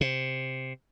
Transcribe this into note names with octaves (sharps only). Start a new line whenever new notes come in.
C3